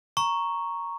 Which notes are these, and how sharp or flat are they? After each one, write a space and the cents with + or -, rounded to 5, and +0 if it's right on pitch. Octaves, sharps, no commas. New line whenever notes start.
A#5 +0 C#6 +0